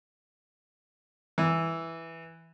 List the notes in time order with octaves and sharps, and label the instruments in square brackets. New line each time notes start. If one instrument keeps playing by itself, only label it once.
[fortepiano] E3